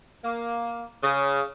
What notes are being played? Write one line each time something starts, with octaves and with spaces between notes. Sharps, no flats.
A#3
C#3